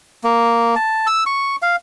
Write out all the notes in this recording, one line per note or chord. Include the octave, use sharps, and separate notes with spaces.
A#3
A5
E6
C#6
F5